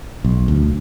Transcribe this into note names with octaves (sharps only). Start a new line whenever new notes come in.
B1
D2